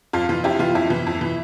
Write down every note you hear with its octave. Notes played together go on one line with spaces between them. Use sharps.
F2 F4
E3 F4
F2 E4 G4
E3 F4
F2 E4
E3
F2
E3